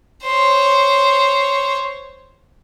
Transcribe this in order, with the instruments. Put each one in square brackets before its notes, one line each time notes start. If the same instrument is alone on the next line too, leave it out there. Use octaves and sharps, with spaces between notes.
[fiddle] C5 C#5